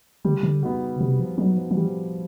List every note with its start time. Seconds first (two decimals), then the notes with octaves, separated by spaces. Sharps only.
0.25 D3 G3
0.34 C#3
0.43 D3
0.62 C#3 B3 D#4 F#4
1.00 C3 G3
1.20 F3
1.38 F#3 B3 D#4 F#4
1.57 F3
1.71 E3
1.77 G3
1.85 F3